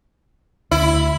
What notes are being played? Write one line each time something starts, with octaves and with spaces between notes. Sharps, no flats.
D2 E4